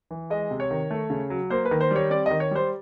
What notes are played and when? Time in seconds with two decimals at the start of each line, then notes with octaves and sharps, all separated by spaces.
0.11 E3
0.30 G#3 D#5
0.51 C3
0.60 C#5
0.71 D#3
0.91 A3
1.10 C#3
1.30 F#3
1.50 A#3 C5
1.65 B4
1.71 D#3
1.81 C5
1.91 G3 C#5
2.10 C4 D5
2.26 D#3 D#5
2.40 C#5
2.51 G3 C5